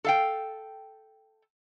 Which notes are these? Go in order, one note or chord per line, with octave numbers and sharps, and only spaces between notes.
A4 F5 G5